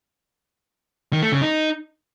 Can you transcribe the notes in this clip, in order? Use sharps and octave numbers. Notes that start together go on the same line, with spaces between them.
D#3
A3
C#3
D#4